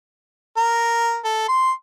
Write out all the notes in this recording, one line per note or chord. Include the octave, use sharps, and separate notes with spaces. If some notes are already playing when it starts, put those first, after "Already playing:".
A#4
A4
C6